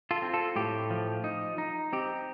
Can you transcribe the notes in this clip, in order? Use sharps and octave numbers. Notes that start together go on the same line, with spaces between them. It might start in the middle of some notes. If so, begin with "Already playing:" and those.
F4 A4
C4
F4 A4
A2 G4
F3
D#4
D#4
C4 G4